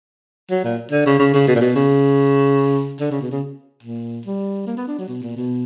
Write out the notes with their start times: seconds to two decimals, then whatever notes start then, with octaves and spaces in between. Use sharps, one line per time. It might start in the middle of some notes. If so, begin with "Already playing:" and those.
0.50 F#3
0.64 A#2
0.91 D3
1.06 C#3
1.19 C#3
1.34 C#3
1.47 B2
1.56 A#2
1.61 B2
1.75 C#3
3.00 D3
3.11 C#3
3.21 B2
3.31 C#3
3.83 A#2
4.26 G3
4.67 A#3
4.77 B3
4.88 D4
4.98 F#3
5.08 B2
5.22 A#2
5.36 B2